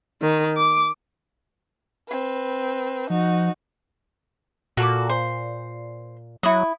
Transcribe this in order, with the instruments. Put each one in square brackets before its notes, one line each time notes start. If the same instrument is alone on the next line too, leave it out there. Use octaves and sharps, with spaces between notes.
[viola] D#3
D6
[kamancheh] C4 B4
[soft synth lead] F3 [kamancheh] D#4 F#4
[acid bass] A#2 [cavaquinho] F#4 A4 D6
[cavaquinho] C5
[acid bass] F#3 [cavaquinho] E4 D#6